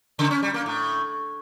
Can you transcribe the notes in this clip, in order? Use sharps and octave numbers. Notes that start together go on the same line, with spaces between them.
C#3
C#4
G3
A#3
A2